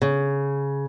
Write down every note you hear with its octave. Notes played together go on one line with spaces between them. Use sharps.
C#3